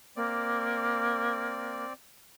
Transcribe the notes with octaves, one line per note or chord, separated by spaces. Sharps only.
A#3 C4 D5